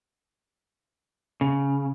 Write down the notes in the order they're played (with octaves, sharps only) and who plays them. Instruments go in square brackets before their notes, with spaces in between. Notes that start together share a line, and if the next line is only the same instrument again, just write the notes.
[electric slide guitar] C#3